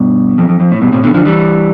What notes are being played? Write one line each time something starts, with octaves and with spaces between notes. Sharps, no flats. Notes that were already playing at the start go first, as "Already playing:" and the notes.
Already playing: G2 B2
F2
F2
F2
A2
G2 B2
A2 C3
B2 D3
D3 F3
E3 G3